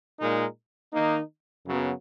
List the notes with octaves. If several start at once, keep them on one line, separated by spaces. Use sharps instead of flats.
A#2 G#3 D#4 A#4
D#3 A#3 D#4
F#2 C#3 F#3 B3